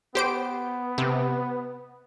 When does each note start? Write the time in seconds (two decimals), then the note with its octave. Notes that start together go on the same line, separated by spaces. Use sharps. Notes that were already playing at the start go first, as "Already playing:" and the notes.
0.15 B3 G4 C5 D7
0.98 C3